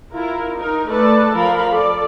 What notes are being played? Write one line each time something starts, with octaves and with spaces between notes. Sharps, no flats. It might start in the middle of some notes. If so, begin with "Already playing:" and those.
E4 F4 A#4
D#4 A#4
A3 A4 B4 D5 A5
F3 A#4 F5 B5
A4 D5